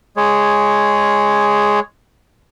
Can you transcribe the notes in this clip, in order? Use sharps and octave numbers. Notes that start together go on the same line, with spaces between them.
G#3 G#4 C#5